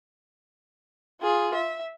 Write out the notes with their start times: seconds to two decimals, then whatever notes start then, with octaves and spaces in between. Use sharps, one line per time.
1.22 F4 G#4
1.54 E5